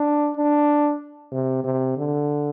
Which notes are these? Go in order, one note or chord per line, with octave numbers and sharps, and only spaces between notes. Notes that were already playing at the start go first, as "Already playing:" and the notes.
Already playing: D4
D4
C3
C3
D3